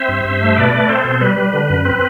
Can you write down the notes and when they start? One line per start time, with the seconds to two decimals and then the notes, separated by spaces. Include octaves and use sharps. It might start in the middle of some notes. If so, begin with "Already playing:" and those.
Already playing: C4 C5 E5
0.09 G2
0.25 G2
0.41 A3 C5
0.56 B2 B4 D5
0.72 A3
0.88 C4 A4 C5
1.04 B2
1.21 G3 B4
1.37 G3
1.53 D3
1.70 F#2
1.85 C4 B4